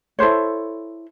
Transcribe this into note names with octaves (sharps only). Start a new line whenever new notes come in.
E4 A4 C5 C#5